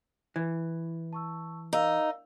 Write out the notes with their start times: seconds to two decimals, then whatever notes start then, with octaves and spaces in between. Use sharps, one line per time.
0.36 E3
1.13 A5 C#6 E6
1.73 D#4 A#4 F5 E6